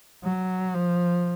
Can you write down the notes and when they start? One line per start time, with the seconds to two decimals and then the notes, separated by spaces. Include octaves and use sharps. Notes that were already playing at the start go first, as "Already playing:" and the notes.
0.24 F#3
0.74 F3